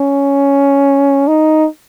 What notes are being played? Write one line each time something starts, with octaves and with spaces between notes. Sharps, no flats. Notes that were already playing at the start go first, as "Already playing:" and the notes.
Already playing: C#4
D#4